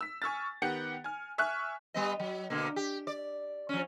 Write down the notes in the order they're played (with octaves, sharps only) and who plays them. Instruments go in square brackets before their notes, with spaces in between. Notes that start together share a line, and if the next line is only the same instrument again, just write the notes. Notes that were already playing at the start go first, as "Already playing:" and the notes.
[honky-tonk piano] E6 B6
G#5 C#6 E6 F6 A6
D#3 B3 G4 F#5 C#7
G#5 F6
E5 G#5 C#6 F6 F#6
[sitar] G3 B3 D#5
F#3
B2 D3 A#3
G4
D5
F3 C#4